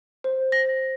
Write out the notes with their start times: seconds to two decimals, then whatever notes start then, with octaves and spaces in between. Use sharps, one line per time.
0.24 C5
0.52 A#6